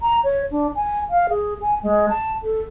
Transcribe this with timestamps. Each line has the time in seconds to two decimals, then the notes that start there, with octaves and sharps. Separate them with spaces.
0.01 A#5
0.24 C#5
0.51 D4
0.75 G#5
1.10 F5
1.29 G#4
1.62 G#5
1.83 G#3
2.09 A5
2.43 A4